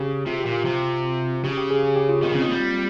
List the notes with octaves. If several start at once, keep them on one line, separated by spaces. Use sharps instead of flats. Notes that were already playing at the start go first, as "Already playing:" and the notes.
Already playing: C#3 G4
C3 F4
G4
A#2
F4
C3
C#3 G4
G4
G#4
G#4
G4
F4
D#3 F4
C#3 C4
D#3
G3 A#3